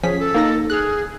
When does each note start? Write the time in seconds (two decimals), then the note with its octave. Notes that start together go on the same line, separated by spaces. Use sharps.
0.03 F3 C#4 G#4 B6
0.19 A4
0.35 A#3 D#4 A#6
0.70 G#4 F6 F#6